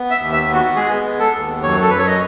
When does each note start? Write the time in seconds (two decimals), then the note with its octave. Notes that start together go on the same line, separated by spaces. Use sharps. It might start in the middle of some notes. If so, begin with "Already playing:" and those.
Already playing: B3
0.11 E5
0.18 D#2
0.33 E5
0.47 B3
0.54 F#4
0.76 G#3 G#4
1.05 B3
1.20 A4
1.34 D#2
1.63 F#2 C#5
1.82 A4
1.90 F#2 B4
1.98 C#5
2.07 D#5